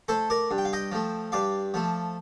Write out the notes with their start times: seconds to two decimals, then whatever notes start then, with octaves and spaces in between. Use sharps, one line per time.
0.08 A3 A4 C5
0.30 A#4 D5
0.51 G2
0.58 G5
0.65 F5
0.73 D#5 G5
0.92 F3 A3
1.32 G2 D5 F5
1.74 F3 A3